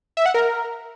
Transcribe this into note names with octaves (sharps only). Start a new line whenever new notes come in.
E5
F#5
A#4